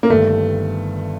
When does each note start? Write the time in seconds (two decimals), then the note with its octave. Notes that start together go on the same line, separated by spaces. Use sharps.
0.03 A#3
0.09 G1 G2 D#3 A3